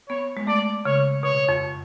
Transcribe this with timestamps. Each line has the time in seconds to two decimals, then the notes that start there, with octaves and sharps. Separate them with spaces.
0.09 B3 C#5
0.37 G#3
0.47 A3 D5
0.85 C#3 C#5
1.23 B2 C#5
1.49 F2